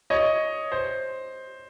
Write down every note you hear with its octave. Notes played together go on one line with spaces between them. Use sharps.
C#5 D#5
C5